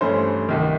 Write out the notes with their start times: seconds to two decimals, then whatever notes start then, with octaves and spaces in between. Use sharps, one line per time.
0.01 G2 E3 A3 C#4 C5
0.49 C2 C3 D#3